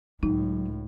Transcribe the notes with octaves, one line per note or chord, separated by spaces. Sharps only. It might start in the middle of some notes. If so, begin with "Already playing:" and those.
C#2 A2 F#3 D#4